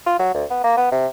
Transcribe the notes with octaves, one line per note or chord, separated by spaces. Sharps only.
F4
F#3
D2
B3
A#3
B3
C3